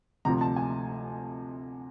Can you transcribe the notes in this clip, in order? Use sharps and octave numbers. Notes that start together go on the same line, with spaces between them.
D2 C3 F3 A#5
A5
G#5